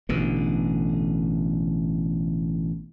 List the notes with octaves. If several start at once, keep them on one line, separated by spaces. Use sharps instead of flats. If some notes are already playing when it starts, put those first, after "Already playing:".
A1 B2 D3